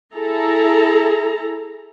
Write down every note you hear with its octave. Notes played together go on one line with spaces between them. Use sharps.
E4 G#4 A4 A#5